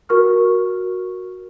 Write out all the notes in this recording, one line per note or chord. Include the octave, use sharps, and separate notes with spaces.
F#4 A#4 C#6 F6